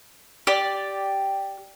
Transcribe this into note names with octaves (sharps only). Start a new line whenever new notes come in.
G4 D5